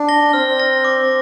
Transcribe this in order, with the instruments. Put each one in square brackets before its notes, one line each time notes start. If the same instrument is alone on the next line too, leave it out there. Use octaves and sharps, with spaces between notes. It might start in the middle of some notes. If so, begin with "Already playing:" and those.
Already playing: [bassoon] D4
[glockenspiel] A#6 G7
[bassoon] C4 [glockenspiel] F6
[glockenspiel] A#6 G7
D6